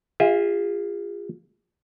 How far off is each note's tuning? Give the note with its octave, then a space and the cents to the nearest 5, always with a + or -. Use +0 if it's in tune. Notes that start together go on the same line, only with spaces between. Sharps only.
F4 +0 G#4 -35 E5 -35